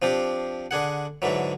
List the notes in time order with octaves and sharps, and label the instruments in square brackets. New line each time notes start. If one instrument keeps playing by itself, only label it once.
[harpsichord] F3 C4 D4 G4
D3 D4 G#4 F#5
G#2 D3 E3 F#3